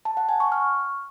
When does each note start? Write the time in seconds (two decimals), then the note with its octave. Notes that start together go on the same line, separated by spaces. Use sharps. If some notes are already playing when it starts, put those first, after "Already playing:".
0.05 A5
0.17 F#5
0.29 G#5
0.40 C#6
0.52 F6